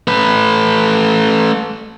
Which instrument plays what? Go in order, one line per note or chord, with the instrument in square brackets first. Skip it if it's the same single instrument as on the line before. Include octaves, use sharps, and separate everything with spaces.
[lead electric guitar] A3 B4